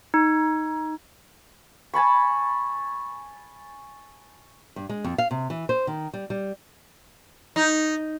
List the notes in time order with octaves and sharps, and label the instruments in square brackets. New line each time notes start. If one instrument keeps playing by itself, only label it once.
[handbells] D#4
[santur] G#5 A5 B5 C#6
[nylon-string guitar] G2
G#3
F2
F5
C3
E3
C5
D#3
G3
G3
[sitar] D#4